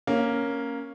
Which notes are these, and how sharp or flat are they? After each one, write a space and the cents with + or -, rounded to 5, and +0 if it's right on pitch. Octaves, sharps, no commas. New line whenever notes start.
A#3 +0 C#4 +0